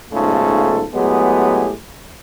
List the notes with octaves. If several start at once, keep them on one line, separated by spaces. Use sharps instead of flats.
B1 G#2 C#3 A3 F4 A4
A2 F#3 G#3 B3 G4 G#4